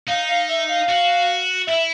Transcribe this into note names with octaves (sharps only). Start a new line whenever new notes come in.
D#4 F5
F5
E5
F5
F#4
E4 E5